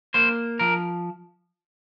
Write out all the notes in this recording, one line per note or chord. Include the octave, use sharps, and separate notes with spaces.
A#3 C5
F3 A#4